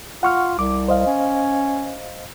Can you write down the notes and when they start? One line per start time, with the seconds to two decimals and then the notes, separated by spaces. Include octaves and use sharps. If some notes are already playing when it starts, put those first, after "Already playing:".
0.23 F4 F#5 C#6 F6
0.59 C2 D6
0.88 C5 D#5 F5
1.07 C#4